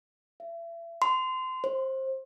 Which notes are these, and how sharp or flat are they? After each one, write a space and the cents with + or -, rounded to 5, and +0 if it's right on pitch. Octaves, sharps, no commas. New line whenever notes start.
E5 +35
C6 -25
C5 +20